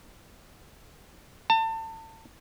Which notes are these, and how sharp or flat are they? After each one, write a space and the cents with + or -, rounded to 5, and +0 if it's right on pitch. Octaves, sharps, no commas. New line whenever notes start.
A5 +30